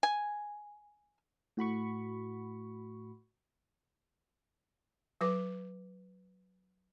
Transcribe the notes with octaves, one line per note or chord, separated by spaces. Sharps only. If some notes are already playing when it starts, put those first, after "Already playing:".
G#5
A2 F#4 B5 C#6
F#3 B4 D6